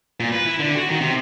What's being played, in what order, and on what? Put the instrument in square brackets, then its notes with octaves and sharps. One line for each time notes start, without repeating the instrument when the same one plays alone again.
[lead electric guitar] A#2
B4
E4
D3
F#4
D#3
C3